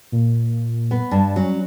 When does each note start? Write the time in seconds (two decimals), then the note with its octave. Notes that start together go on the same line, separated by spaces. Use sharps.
0.12 A#2
0.91 B3
1.11 G2 A5
1.36 F#3 C#4